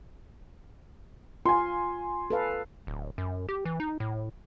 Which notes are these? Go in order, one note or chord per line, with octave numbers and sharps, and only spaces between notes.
F4 G#5 C6
A4 B4 F5
D1
F#2
G4
E3
D#4
A2